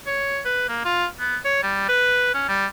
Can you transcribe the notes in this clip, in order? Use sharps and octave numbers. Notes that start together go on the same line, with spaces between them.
C#5
B4
A#3
F4
B3
C#5
G3
B4
C#4
G3